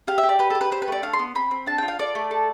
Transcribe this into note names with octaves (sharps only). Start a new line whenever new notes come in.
G4 F5
E5
G4
D5
G4 B4
A4
G4
B4
G4 C5
B4
A3 D5
D4 F5
C6
B3
C4 B5
C4
D4 A5
F4 G5
F5
A4 D5
A3
A4